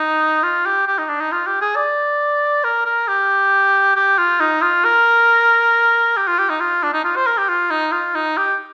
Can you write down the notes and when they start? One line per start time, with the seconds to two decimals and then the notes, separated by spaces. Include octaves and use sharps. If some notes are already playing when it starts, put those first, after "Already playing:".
Already playing: D#4
0.43 F4
0.66 G4
0.87 G4
0.98 D#4
1.09 D4
1.21 D#4
1.32 F4
1.46 G4
1.61 G#4
1.76 D5
2.64 A#4
2.85 A#4
3.08 G4
3.96 G4
4.18 F4
4.40 D#4
4.62 F4
4.85 A#4
6.17 G4
6.27 F4
6.39 G4
6.49 D#4
6.60 F4
6.83 D4
6.93 D#4
7.04 F4
7.16 C5
7.27 A#4
7.38 G4
7.49 F4
7.71 D#4
7.92 F4
8.15 D#4
8.37 G4